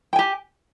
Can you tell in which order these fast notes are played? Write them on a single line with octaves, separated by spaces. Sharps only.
G5 G#5 G4